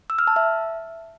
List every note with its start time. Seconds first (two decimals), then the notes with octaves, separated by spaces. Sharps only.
0.10 E6
0.19 F6
0.27 A5
0.36 E5